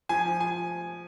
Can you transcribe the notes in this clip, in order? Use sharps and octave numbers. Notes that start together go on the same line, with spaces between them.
F3 G#5
F3
G#5